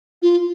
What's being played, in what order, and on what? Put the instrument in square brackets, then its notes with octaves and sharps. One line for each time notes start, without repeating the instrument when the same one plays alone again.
[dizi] F4